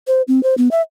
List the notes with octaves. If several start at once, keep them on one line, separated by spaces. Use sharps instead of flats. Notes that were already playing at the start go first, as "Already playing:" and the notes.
C5
C4
C5
B3
E5